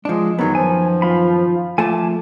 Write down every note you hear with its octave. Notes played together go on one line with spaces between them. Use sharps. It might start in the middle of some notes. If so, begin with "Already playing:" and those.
F3 G#3 D4
F#2 D#3 F#3 B3
F3 G#5
F4 B5
F3 A3 G#5 A5 D6